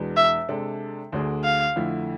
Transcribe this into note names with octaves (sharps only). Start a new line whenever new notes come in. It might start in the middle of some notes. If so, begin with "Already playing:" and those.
Already playing: E2 B2 G#3 D4
E5
C3 G#3 D4 A4
D2 D3 A3 D4 G#4
F5
F2 D3 A3 E4